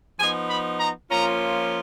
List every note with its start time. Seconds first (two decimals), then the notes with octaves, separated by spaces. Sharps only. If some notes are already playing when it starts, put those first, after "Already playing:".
0.20 F3 B3 D#4 G#5
0.50 B5
0.80 A#5
1.10 F3 A#3 C#4 F4 A#5